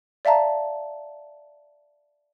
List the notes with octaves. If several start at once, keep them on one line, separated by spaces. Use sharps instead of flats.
D5 E5 F5 A5 A#5